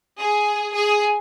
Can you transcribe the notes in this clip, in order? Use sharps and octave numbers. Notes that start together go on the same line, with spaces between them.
G#4
G#4